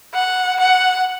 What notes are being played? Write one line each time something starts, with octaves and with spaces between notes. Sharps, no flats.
F#5
F#5